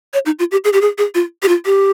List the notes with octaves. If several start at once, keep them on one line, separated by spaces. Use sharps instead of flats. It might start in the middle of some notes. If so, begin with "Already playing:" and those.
C#5
D#4
F4
G4
G#4
G4
G#4
G#4
F4
G4
F4
G4